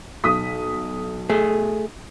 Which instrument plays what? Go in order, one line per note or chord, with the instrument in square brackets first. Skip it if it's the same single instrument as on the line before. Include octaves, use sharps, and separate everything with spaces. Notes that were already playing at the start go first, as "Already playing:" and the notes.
[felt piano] B1 D#6 B6
[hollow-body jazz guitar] A3 G#4